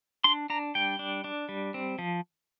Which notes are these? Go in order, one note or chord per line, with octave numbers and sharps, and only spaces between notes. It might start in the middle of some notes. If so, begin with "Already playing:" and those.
D4 C6
D4 A#5
G3 G5
D4
D4
G3
C4
F3